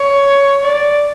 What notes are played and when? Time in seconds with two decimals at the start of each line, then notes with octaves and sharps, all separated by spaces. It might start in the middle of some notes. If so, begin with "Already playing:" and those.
Already playing: C#5
0.63 D5